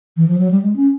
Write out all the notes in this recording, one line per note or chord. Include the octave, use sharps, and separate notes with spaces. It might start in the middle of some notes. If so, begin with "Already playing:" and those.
E3
F3
F#3
G3
G#3
C#4